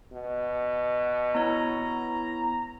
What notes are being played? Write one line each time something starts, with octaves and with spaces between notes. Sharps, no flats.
B2
B3 E4 C#5 A#5